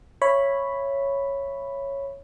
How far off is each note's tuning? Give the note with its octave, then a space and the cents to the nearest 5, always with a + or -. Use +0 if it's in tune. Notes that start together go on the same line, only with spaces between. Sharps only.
C#5 -5 E5 +30 B5 +0